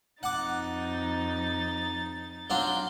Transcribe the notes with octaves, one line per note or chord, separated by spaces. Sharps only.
F2 D#4 F#5 D6 A6
F#3 D4 F4 G6